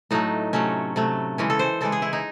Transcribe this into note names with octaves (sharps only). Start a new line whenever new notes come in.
A2 F#3 A3 D#4
C3 F#3 A3 C#4
C3 F#3 A3
C#3 E3 G#3 C#4
A4
C5
C#3 E3 G#3 A4
G#4
E4
D#4